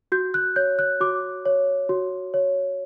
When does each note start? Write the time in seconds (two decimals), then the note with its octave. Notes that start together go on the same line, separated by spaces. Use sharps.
0.12 F#4 G6
0.34 F#6
0.56 C#5 G6
0.79 F#6
1.00 F#4 D6
1.46 C#5
1.89 F#4
2.34 C#5